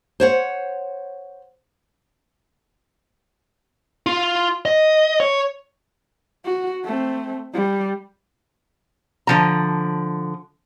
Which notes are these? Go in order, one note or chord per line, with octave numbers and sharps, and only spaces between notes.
C5 C#5 F#5
F4
D#5
C#5
F#4
A3 C4
G3
D3 F3 A#5